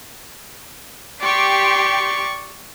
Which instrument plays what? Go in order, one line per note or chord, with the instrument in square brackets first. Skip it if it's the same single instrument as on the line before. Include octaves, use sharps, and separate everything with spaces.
[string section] G4 C6 [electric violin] D5 C#6